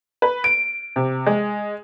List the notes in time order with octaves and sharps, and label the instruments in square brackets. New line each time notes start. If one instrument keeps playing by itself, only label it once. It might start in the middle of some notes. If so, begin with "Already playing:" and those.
[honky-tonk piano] B4
D7
C3
G#3